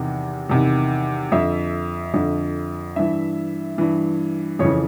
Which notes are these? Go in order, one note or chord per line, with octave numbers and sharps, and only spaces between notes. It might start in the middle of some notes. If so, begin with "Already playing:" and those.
Already playing: E2 C3 D#3
E2 C3 D#3
F2 D3 E5
F2 D3
G2 E3 E5
G2 E3
F2 C#3 E3 C#5